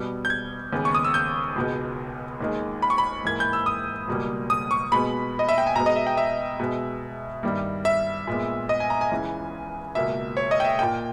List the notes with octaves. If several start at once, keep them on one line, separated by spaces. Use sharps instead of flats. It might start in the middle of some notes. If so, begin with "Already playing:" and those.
Already playing: B2 G3 B3
G6
G#6
D#2 C#3 G#3 B3
C#6
D#6
E6
G6
C#2 B2 G#3 B3
D#2 D#3 G#3
B5
C#6
B5
G#2 E3 A#3 G#6
G6
E6
D#6
C#2 B2 G3 A#3
D#6
C#6
B2 G#3 B3 B5
D#5
E5
G5
G#5
B2 G#3 B3 A#5
D#5
E5
G5
E5
B2 G#3 B3
G2 D#3 G3
E5
A#2 G#3 B3
D#5
G#5
A#5
G#5
C#2 C#3 E3
C#2 B2 A#3 E5
C#5
D#5
G5
E5
A#2 A#3 G5